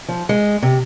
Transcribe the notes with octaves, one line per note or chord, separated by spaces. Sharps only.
F3
G#3
C3